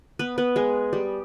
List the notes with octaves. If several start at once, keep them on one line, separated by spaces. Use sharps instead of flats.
B3 B4
B3 B4
G#3 G#4
G3 G4